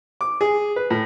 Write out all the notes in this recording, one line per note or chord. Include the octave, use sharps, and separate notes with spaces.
D6
G#4
B4
A2